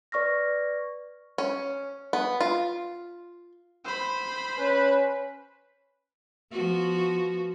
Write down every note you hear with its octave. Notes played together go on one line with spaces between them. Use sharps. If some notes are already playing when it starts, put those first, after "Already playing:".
B4 D5 C#6 F6 A#6
C#4
B3
F4
C5 B5
C#4 B4
F3 B3 F#4